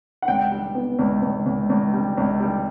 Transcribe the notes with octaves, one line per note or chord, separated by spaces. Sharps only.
F#5
C#2 G5
G3
B3
C#2
C#2
C#2
C#2
G3
C#2
G3